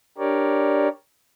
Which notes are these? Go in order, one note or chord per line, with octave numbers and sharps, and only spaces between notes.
D4 G4 A#4 C#5 D5